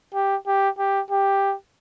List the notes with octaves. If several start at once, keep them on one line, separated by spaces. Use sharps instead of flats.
G4
G4
G4
G4